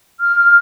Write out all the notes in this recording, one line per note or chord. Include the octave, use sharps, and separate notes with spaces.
F6